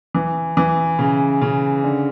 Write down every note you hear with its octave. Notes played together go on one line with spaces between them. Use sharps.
E3
E3
C#3
C#3
D3